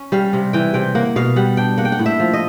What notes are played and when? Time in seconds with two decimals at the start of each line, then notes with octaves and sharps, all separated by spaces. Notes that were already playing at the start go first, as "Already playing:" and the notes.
Already playing: C#4
0.12 G3 F5
0.33 C3
0.53 E3 G5
0.74 C3 G5
0.95 A#3 F#5
1.16 B2 F5
1.36 G3 F#5
1.57 D4 G5
1.78 A#3 F#5
1.85 G5
1.92 F#5
1.99 A2
2.06 E5
2.20 F3
2.33 D#5